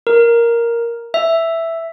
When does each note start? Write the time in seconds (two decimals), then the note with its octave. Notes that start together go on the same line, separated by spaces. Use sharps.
0.07 A#4
1.14 E5